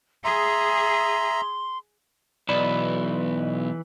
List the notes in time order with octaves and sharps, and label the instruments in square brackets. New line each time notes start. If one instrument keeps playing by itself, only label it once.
[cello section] G#4 [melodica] E5 A#5 [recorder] C6
[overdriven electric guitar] B1 [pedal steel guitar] E3 B5 [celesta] D5 E7